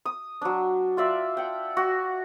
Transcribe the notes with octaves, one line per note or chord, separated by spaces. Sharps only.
D#6
F#3 D4
F4 D5 E5
F#5 G5
F#4